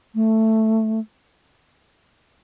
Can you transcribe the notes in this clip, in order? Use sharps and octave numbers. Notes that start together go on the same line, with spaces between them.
A3